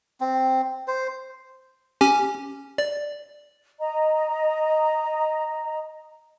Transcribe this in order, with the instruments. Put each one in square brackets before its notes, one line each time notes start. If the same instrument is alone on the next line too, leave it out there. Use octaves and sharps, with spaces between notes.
[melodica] C4
C5
[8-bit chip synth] C#4 G4 G#5
D5
[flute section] D#5 A#5